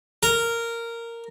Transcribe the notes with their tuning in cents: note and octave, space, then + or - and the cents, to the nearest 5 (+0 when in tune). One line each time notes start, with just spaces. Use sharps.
A#4 -10